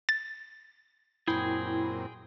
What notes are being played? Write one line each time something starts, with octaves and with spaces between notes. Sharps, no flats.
A6
F#2 A#2 C4 E4 G#4 G5